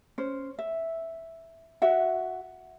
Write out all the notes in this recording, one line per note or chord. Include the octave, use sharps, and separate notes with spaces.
C#4 C5
E5
F#4 E5 F#5